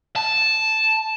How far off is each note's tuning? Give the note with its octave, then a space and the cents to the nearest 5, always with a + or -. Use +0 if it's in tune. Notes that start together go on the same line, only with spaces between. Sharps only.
A5 -5